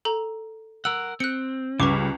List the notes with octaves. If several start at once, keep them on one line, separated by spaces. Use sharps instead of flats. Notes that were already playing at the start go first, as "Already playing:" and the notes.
A4 A#5
A#4 F#5 E6
C4 F#6 C#7
C#2 C#3 G3 B4 C#6 D6